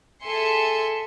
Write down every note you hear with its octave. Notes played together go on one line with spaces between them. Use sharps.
G#4 A4 E5 G#5 C6 C#7